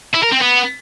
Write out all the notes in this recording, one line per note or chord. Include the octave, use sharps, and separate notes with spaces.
E4
A#4
C4
B3